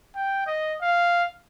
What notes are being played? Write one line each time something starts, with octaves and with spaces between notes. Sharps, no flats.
G5
D#5
F5